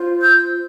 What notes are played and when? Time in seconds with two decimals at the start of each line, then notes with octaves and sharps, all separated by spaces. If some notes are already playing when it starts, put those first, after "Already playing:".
Already playing: F4 C5
0.21 E6 G6